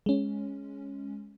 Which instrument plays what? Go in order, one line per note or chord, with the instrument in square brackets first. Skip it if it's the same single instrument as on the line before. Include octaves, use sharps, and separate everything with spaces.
[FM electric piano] G#3 C#4